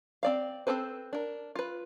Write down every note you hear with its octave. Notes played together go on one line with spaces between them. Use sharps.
C4 D5 F5
C4 E4 A4 B4 C5
D4 A#4
F4 B4